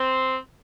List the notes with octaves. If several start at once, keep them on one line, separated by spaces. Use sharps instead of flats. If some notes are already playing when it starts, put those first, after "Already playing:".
Already playing: C4